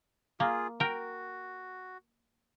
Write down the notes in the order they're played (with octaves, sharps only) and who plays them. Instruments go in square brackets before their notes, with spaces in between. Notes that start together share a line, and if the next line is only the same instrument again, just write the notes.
[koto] A#3 [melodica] F4 G#4
[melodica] F#4 [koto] A#4 G5